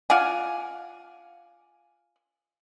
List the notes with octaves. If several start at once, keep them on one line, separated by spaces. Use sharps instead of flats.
F4 D5 F#5 G#5